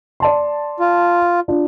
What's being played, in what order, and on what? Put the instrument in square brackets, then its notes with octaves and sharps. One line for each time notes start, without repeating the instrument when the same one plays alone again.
[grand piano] D5 A5 C6
[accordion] F4
[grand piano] D4 F4